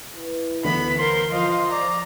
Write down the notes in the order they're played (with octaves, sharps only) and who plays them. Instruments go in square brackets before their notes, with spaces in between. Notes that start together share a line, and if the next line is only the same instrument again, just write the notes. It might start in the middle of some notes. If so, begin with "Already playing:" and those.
[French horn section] E4 B4
[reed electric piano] D2 D3 E3 [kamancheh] B3 B5
[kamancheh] A#4 C6 [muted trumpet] C5
[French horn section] F3 [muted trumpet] C5 [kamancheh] D#5 F5
[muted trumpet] D5 [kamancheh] A#5